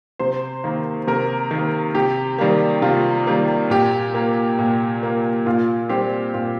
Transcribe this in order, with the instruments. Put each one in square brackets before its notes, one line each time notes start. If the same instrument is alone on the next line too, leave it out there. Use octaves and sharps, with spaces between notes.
[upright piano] C3 C5
D#3 A#3
C3 A#4
D#3 A#3
C3 G4
D#3 G3 A#3
C3 F4
D#3 G3 A#3
A#2 G4
A#3
A#2
A#3
A#2 F4
G3 C4 G4
A#2 F4